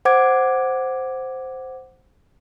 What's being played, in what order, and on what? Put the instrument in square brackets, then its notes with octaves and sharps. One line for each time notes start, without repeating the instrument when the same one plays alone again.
[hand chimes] C5 F#5 D6 G#6 D7